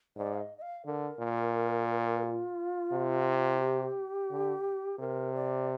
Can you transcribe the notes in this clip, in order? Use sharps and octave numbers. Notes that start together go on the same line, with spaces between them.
G#2 D5
F5
D#5
D#5
F5
D3 A#4
A#2
F4
C3
G4
D3
C3 A#4
D5